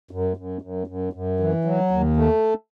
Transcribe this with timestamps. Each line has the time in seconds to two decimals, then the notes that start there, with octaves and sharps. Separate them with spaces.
0.11 F#2
0.37 F#2
0.62 F#2
0.87 F#2
1.13 F#2
1.40 E3
1.65 F#3
1.91 D#2
2.17 A3